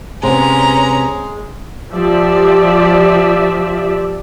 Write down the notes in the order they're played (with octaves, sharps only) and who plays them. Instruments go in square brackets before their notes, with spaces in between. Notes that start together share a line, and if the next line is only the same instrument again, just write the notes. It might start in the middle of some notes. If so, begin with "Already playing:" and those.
[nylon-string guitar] C3 B3 [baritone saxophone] G#3 [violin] C#4 A#5
[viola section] F3 G4 D5 E5